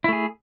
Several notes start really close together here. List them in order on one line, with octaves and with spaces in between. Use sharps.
E4 A3 G#4